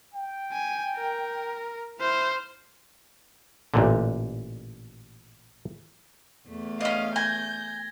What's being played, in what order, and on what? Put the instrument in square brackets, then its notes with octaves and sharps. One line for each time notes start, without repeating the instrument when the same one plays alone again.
[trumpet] G5
[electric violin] G#5
A#4
[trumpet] E4 [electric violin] C5 F6
[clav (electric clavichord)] A1 A#2 D3
[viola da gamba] E2 A3
[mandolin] C#4 D#5 [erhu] F5
[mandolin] G#5 [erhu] G6 [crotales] G#6 A#6 G7